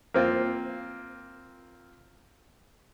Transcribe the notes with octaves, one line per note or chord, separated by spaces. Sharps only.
A#3 C4 F4